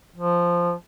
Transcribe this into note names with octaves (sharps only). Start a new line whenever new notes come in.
F3